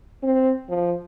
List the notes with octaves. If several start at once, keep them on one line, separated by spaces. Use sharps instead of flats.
C4
F3